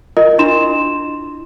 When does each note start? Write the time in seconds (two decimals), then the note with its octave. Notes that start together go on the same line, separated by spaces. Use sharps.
0.17 F4 A#4 D#5
0.38 D4 E4 F4 C6 E7